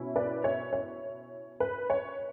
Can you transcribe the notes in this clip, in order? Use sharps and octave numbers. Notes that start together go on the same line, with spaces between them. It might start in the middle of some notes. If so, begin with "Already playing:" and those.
Already playing: B2 C#4 E4
B4 D5
C#5 E5
C#5
B4
C#5